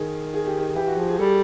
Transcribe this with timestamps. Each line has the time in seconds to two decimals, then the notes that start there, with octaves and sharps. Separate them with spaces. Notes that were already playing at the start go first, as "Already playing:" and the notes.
Already playing: D#3 G#4
0.34 G#4
0.47 G4
0.59 G#4
0.75 E3 G4
0.87 F#4
0.97 F3 G#4
1.08 G#4
1.19 G3 A4